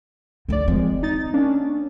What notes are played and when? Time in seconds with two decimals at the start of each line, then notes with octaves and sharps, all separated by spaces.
0.49 C#2 D3 A3 D5
0.67 D#3 F3 G#3 C4
1.03 D#4 A6
1.34 A#3 C#4 D4